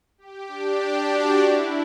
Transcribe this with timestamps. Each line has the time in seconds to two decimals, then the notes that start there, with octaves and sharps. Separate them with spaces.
0.18 G4
0.48 D4
1.10 F#4
1.39 E4